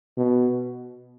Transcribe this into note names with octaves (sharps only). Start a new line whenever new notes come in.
B2